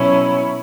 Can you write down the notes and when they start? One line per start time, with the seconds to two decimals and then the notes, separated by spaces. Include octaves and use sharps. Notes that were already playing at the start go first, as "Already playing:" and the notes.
Already playing: B2 F#3 C#4 E4